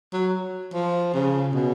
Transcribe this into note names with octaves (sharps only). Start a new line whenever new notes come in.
F#3
F3
C#3
B2